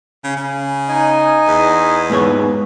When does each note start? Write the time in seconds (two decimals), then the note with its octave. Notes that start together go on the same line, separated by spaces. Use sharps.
0.24 C#3
0.37 C#3
0.89 D#4 D#5 G#5
1.48 E2
2.10 G#2 B3 C#5